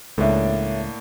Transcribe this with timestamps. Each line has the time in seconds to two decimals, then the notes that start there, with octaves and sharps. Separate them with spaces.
0.18 C#2 A2 A#3 D4 A4 C#5 E5